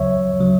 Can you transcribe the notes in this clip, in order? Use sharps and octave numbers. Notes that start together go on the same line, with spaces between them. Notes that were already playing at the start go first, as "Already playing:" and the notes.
Already playing: D2 C#3 F#3 C#5 E5
C#3 F#3